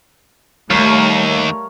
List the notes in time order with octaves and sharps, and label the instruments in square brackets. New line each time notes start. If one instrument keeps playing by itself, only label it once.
[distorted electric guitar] D#2 [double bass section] G3 A3 [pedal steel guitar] A#4 C#5 F5